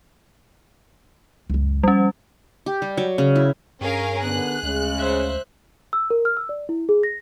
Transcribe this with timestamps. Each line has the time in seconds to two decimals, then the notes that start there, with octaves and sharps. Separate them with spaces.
1.50 C#2 F#2
1.83 F3 G3 C#4
2.66 G4
2.82 G3
2.97 F#3
3.18 C#3
3.36 E4
3.81 G2 C#4 G#4 A#4 F5
4.22 D3 B3 F#6
4.63 D2 C#3 G#3
4.97 C5 E5
5.93 E6
6.10 A#4
6.25 F6
6.37 E6
6.49 D5
6.69 E4
6.89 G#4
7.03 A#6